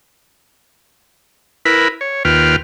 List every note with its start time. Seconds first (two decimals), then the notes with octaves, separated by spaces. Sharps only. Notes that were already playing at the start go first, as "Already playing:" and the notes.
1.65 E4 A#4 B4 B5
2.01 C#5
2.25 D#2 F4 B4 G5 F6